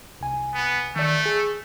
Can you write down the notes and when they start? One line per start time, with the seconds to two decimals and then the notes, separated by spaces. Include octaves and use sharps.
0.21 C2 G#5
0.55 B3
0.96 D#3 A3 D5
1.26 G#4